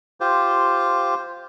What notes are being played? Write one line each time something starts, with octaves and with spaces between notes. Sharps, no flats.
F4 G4 C5